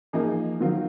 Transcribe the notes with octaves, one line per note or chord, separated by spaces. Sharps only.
F3 A#3 D#4 G#4
D#3 F#3 C4 F4